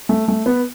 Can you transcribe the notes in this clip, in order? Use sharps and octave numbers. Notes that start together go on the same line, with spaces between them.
A3
A3
B3